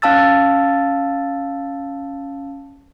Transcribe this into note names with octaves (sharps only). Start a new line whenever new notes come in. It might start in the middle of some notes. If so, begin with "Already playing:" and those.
C#4 F5 A5 E6 A6